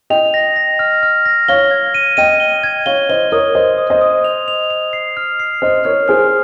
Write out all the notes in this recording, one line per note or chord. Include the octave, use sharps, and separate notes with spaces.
D#5 G5 F7
A#6
A#6
F6
F6
A#6
C#5 F5 G7
G#6
D#7
D#5 G5 D#7
G7
G#6
C#5 F5 G7
C5 D#5 G7
A#4 C#5 D#6
C5 D#5 D#6
D#6
C5 D#5
D#6
F7
F7
F7
C7
F6
C7
C5 D#5 F6
A#4 C#5 F6
G#4 C5 F6